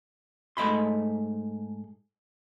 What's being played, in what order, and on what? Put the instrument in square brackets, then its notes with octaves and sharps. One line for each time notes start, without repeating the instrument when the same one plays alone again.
[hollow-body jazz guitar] G#2 A3 D#5 B5 C6